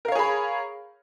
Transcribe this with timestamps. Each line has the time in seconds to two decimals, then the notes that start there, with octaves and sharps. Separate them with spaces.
0.05 A#4
0.08 F5
0.12 C#5
0.15 G#4
0.19 B5